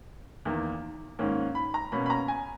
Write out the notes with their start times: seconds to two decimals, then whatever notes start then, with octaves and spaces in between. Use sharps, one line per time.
0.45 E2 D#3 A#3
1.19 G#2 D#3 A#3 C#4
1.55 B5
1.74 A#5
1.92 B2 A#3 C#4 B5
2.06 B5
2.10 A#5
2.28 G#5